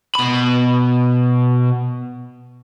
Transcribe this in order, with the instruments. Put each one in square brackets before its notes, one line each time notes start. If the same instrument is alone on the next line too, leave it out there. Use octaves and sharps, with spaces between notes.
[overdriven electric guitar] B2 B5